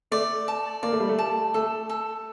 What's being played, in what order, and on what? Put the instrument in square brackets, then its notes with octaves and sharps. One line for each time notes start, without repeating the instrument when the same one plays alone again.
[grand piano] A3 [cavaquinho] D5
[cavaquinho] A5
[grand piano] A#3 [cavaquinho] D5
[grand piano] A3
G3
A3
[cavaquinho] A5
[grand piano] A3 [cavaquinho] A4
[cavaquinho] A4